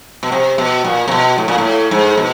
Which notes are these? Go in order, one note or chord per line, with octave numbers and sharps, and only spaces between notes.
B2
C3
B2
A#2
C3
B2
A2
A#2
A2
G#2
B2